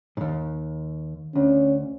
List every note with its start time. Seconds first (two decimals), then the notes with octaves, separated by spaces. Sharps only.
0.17 D#2 G#2
1.35 D2 C#4